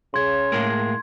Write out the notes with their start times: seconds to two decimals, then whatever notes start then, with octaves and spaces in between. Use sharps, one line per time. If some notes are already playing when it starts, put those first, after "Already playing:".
0.14 C#3 C6 G#6
0.52 A2 G#3 A#3